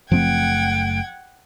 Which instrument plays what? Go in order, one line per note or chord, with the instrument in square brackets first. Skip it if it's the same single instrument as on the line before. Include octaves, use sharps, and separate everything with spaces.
[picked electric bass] F#1 A3 [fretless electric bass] F3 C4 [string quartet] F#5 G5 G#6 [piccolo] D7